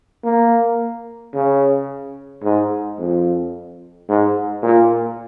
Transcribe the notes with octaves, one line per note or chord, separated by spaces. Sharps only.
A#3
C#3
G#2
F2
G#2
A#2